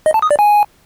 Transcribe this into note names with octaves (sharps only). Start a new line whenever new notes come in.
D#5
A5
D#6
D5
G#5